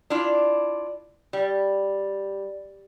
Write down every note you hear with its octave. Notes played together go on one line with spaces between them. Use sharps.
D4 E4 F4
G3